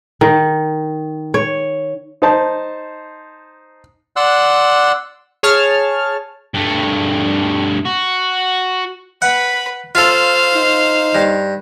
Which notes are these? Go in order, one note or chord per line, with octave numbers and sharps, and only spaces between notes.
D#3
C#5
D#4 C5 A5
D5 F#5 C6 E6 F#6
G#4 C#5 A5 F6
G2 A3
F#4
B4 F#5 B5
F4 A4 C5 F5
D#4
G2